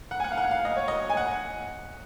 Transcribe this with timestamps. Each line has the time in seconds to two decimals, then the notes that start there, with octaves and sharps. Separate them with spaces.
0.11 F#5
0.20 G#5
0.24 F#5
0.31 F5
0.38 F#5
0.51 F5
0.65 D#5
0.76 C#5
0.88 D#5
1.10 G#5
1.17 F#5